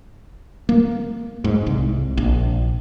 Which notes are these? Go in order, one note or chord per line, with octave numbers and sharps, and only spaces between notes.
A#3
G#2
C2
A#1